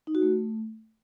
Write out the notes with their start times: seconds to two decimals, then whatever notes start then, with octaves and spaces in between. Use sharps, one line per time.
0.07 D#4
0.15 F#4
0.22 A3